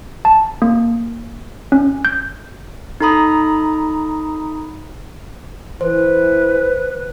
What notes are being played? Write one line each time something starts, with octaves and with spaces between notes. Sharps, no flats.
A5
A#3
C#4
G6
D#4 A4 A#5 B5 D#6
E3 B4 C5